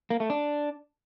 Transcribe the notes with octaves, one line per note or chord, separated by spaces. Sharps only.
A#3
A3
D4